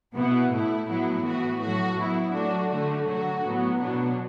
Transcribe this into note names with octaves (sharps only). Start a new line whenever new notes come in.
B2 B3 E4
A2 A3 E4
A2 F#3 B3 E4
A2 E3 B3 F#4
A2 F#3 A3 F#4
F#3 B3 E4
F#3 A3 D4 F#4
D3 A3 F#4
D3 F#3 A3 F#4
A2 F#3 B3
B2 F#3 B3 D4